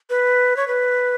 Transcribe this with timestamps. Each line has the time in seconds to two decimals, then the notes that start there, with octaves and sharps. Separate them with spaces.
0.10 B4
0.57 C#5
0.68 B4